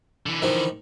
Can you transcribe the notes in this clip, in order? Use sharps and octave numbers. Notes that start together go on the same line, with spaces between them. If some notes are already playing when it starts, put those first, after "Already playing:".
D3 E3
D#3 F3